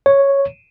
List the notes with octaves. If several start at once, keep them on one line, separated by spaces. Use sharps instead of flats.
C#5